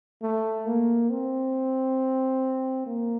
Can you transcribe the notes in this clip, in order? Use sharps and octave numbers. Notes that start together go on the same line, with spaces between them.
A3
A#3
C4
A#3